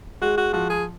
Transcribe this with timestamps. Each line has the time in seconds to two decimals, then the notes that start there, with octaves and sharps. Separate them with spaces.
0.21 G#3 F#4
0.38 F#4
0.53 F3 F#4
0.70 G#4